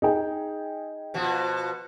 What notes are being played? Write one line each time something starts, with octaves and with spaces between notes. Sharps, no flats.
D#4 G#4 G5
B2 F3 F#4